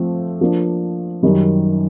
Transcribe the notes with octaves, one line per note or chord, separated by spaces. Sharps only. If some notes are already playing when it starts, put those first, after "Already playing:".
Already playing: F3 A3 C4
F3 A#3 D4
F#2 D#3 G3